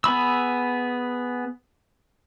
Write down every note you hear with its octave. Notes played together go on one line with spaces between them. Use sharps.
B3 G#4 B5 E6